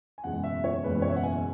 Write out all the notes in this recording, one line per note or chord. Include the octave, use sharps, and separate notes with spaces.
G#5
F#1 E2 B2 G#3 F#5
E5
C#5
F#1 E2 B2 G#3 B4
B4
C#5
E5
F#5
G#5